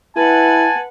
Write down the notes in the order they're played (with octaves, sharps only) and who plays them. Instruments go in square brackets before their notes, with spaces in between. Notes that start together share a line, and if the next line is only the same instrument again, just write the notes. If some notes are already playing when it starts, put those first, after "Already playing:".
[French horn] E4 [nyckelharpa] B4 F#5 [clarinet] G#5 [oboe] A5